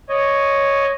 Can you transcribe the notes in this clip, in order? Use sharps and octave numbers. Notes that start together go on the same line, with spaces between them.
C#5 D#5